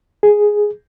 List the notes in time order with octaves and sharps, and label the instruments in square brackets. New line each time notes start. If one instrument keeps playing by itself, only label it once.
[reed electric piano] G#4